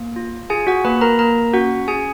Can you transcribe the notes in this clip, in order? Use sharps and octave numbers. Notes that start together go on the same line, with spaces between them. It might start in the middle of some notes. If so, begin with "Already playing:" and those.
Already playing: A#3
F4
F4 G#4 G#5
F#4 F#5
A#3 B4 B5
A#4 A#5
A#3 A#4 A#5
C#4 F#4 F#5
C#4 G#4 G#5